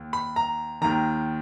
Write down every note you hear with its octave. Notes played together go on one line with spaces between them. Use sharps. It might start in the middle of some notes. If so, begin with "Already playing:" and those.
Already playing: D#2
B5
A#5
D#2 D#3 A#5